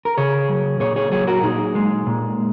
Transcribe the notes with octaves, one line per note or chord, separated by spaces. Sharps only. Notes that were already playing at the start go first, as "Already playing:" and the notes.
A#4
C#3 G#4 C#5
F#3
A#2 G#4 C#5
G#4 C#5
F#3 G#4 C#5
F#4 A#4
A#2 D#4 G#4
G#3
A#2